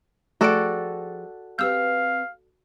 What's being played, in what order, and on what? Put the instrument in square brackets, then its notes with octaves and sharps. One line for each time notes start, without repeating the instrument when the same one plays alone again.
[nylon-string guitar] F3 G#4 G5 [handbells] A3 D7 [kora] F#4 A4 D5
[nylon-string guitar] C4 G4 B4 [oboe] F5 [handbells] E6 G6